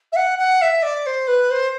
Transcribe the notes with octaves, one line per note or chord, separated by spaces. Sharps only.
E5
F#5
F#5
E5
D5
C5
B4
C5